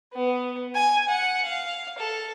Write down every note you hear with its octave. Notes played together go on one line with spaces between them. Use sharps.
B3
G#5
F#5
F5
A4